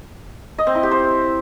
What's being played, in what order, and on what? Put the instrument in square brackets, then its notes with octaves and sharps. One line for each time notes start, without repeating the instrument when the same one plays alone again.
[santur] D#5
C4
E4
G4
C5